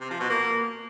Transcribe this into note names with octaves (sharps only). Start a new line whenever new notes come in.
C3
F3
B2
A#3